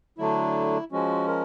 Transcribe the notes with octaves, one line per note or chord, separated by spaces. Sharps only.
D3 F#3 A3 D4 E4
F3 G#3 C#4 F#4
A#4